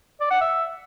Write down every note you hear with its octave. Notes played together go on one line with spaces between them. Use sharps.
D5
F#5
E5